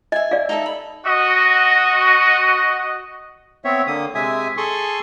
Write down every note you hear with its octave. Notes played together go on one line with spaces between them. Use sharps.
D#5 E5 G#5
D5 F5
D#4 A4 E5
B5
F#4 D#5
B3 C4 C#5 E5
D3 A#3 D#6
C3 G#3 E5 G#5 D#6
G#4 A4 C6 C#6 D#6